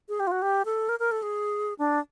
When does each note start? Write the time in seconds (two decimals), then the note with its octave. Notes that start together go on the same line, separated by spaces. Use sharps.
0.09 G#4
0.20 G4
0.27 F4
0.32 F#4
0.42 G4
0.65 A4
0.89 A#4
1.00 A#4
1.11 A4
1.23 G#4
1.79 D4